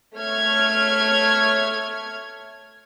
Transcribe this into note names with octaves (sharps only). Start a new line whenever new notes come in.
A3 C#5 F6 G#6